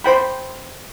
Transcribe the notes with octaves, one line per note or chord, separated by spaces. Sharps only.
C5 G5 B5